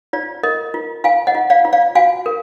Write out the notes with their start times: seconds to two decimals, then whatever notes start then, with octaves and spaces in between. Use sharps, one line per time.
0.13 F4 D5
0.43 A#4 D#5
0.74 F4
1.04 F4 F5 G#5
1.27 D#5 F#5
1.35 F4
1.50 D5 F5
1.65 F4
1.73 D5 F5
1.95 F#4 F5 G#5
2.26 A#4